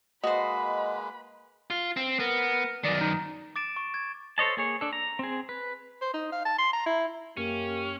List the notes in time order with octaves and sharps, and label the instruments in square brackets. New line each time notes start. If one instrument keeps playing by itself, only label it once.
[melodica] G#3 A#3 B4 [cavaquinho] F#4 C5 [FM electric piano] D#5 [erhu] B5
[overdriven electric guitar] F4
C4
[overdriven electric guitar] B3 [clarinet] A#4
[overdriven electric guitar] F#2 D#3 [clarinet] D5
[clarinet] D#4
[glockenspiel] D6 A6 D7 E7
C#6
G#6
[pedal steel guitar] A4 C5 C#5 D#5 A5
A#3 G#4 C#5
D4 A4
A#5
C4 G#4
B4
[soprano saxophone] C5
D#4
F5
A5
C6
A#5
E4
[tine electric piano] F#2 [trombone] A#3 [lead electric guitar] C#4 [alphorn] G4